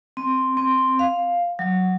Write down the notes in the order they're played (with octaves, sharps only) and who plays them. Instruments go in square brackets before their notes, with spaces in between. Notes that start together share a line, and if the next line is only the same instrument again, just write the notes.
[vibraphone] C4
C4
F5
F#3